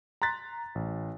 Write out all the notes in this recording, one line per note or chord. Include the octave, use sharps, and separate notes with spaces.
A#5 C6 F#6 A6 B6
A1